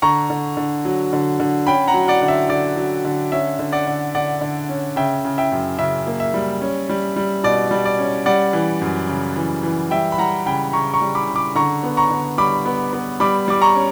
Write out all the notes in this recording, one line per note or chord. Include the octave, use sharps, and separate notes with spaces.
D3 A#5 C#6
D3
D3
F#3
D3
D3
C#4 G5 B5
F#5 A#5
F#3
D5 F#5
D3
E5
D3 D5
F#3
D3
C#4 E5
D3
D5 F#5
D3
D3 D5 F#5
D3
C#4
C#3 E5 G5
C#3
E5 G5
F#2
C#3 E5
A#3
E5
G3
C#4
G3
G3
B2 D5
G3
D5
C#4
G3 D5 F#5
E3
F#2
C#3
E3
E3
G3 E5 G5
B5
G3 F#5 A#5
C#3 G5 B5
C#3 A#5 C#6
A#5 C#6
G3
B5 D6
C#3
B5 D6
D3 A#5 C#6
B3
A#5 C#6
D3
G3 B5 D6
B3
B3
G3 B5 D6
G3 D6
A#5 C#6
C#4